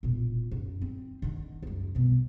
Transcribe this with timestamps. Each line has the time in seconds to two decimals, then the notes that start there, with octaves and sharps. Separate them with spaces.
0.03 E1 A#2
0.52 F#2
0.82 C4
1.22 D3 D#3
1.63 C#2 F#2
1.95 C2 B2